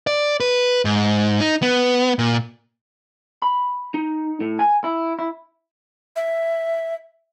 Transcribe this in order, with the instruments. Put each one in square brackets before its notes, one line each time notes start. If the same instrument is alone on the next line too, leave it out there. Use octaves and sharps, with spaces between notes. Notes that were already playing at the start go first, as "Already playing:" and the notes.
[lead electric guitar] D5
B4
G#2
D#4
B3
A#2
[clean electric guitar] B5
D#4
A2
G#5
E4
E4
[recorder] E5